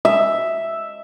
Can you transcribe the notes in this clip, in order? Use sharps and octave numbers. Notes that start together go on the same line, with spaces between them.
E5